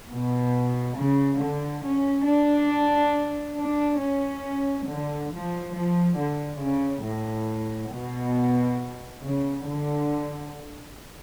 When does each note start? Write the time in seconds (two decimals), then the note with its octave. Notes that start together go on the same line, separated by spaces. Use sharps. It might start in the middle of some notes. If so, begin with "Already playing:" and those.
0.10 B2
0.97 C#3
1.40 D3
1.83 C#4
2.27 D4
3.58 D4
4.02 C#4
4.89 D3
5.32 F3
5.76 F3
6.19 D3
6.62 C#3
7.06 A2
7.93 B2
9.23 C#3
9.66 D3